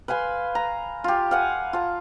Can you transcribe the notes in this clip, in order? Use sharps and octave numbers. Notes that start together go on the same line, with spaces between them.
B4 F5 G#5 C6
A#5
F4 G4
F5 F#5 G#5
F4 A5